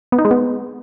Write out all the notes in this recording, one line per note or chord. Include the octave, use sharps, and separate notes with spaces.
B3
D#4
G#3
B3